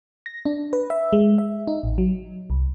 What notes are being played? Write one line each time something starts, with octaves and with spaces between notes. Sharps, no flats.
A#6
D4
B4
E5
G#3
E5
D#4
A1
F#3
C2